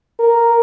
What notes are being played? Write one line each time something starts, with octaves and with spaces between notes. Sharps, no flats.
A#4